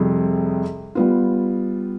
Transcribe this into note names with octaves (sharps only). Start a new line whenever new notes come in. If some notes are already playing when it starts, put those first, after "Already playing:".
Already playing: F2 C3 G3 G#4
G3 B3 F4